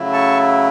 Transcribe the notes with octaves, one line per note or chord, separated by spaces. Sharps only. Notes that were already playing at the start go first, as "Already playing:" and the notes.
Already playing: C#3 F#3 A3 E4
A5 C#6